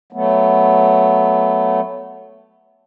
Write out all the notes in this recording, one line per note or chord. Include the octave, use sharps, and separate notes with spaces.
F#3 A3 B3